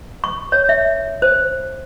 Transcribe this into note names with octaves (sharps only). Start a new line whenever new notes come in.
C#6
C#5
E5
C5